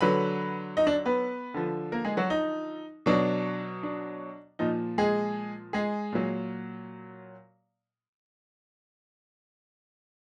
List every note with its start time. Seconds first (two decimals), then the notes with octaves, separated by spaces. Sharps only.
0.01 D3 F#3 B4 B5
0.77 D#4 D#5
0.87 D4 D5
1.05 B3 B4
1.54 D3 F3
1.92 A#3 A#4
2.05 G#3 G#4
2.17 F#3 F#4
2.30 D#4
3.06 B2 F#3 D4
3.83 D4
4.59 A#2 F3 D#4
4.98 G#3 G#4
5.73 G#3 G#4
6.12 A#2 F#3